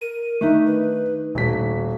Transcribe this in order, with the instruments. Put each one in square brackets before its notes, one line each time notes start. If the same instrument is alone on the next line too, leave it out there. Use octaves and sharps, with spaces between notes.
[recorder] A#4 [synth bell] D#7
[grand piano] D#3 [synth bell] A3 D4 D#4 [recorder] E5
[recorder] B4
[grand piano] D#1 B6 [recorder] F#4